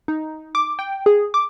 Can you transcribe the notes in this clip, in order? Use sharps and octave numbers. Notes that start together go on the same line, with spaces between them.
D#4
D6
G5
G#4
D6